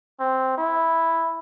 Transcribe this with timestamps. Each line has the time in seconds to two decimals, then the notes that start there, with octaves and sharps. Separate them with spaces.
0.20 C4
0.58 E4